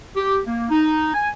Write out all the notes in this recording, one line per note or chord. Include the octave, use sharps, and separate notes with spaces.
G4
A#3
D#4
G#5